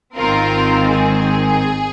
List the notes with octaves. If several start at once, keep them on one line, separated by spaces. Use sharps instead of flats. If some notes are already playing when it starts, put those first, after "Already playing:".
G#1 G#2 D#3 C4 F4 A#4
G#4